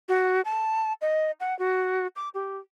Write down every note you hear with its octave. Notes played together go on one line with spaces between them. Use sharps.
F#4
A5
D#5
F#5
F#4
D6
G4